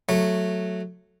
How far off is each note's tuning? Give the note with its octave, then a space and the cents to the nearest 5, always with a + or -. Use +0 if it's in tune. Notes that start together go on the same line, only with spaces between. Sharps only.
F#3 -5 A3 +0